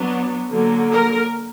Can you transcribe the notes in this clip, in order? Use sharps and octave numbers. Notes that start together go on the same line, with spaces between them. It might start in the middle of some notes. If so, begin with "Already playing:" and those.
Already playing: F#3 B3 D4
D3 F#3 A#3
A#4